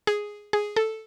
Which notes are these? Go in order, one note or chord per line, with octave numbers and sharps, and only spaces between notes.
G#4
G#4
A4